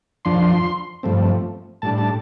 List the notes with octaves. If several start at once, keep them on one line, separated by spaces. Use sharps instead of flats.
F2 F3 D4 C6
G2 F3 A3 C4
A2 G3 D4 A5
A5